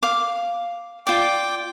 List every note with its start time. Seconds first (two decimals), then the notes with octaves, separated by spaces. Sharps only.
0.03 F5 D6
1.07 F4 D5 G5 D6